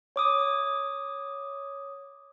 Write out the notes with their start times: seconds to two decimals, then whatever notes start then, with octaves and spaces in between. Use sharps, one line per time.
0.16 C#5 D6 D#6